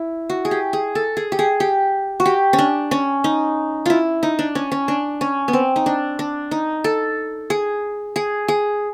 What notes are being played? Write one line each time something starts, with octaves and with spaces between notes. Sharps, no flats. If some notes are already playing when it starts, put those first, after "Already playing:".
Already playing: E4
F#4
G#4
G4
G#4
A4
G#4
G4
G#4
G4
F#4
G4
C#4
D4
C#4
D#4
E4 F4
D#4
D4
C#4
C#4
D4
C#4
B3
C4
D#4
D4
D4
D#4
A4
G#4
G#4
G#4